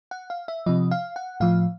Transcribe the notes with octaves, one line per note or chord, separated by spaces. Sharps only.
F#5
F5
E5
C3 F3 D#5
F5
F#5
A2 F3 F5